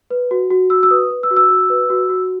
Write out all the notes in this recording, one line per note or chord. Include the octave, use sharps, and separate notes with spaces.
B4
F#4
F#4
F#4 E6
E6
B4 D#6
B4
E6
F#4
E6
F#4
B4
F#4
F#4